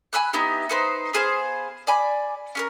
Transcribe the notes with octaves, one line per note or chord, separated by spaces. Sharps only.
G#5 B5 E6 F#6
B3 D#4 E4 G4
D#4 B4 C5
B3 G#4 C5 F5
D5 G#5 B5
C#4 G#4 A#4